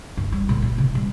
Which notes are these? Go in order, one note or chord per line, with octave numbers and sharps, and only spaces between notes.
G2
G3
A#2
B3
C3
G3